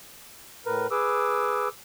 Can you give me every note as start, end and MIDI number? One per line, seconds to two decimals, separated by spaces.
0.66 0.87 45
0.66 0.87 70
0.66 0.87 71
0.91 1.68 68
0.91 1.68 71
0.91 1.68 86
0.91 1.68 88